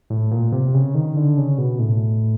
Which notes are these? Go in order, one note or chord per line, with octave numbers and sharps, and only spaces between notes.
A2
A#2
C3
C#3
D#3
D3
C#3
B2
A2